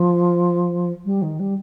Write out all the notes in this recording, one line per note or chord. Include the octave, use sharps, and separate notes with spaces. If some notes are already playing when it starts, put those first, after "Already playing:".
Already playing: F3
G3
D#3
G3